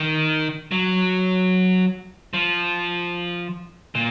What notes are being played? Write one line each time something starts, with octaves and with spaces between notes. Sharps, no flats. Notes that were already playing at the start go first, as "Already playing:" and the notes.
Already playing: D#3
F#3
F3
A#2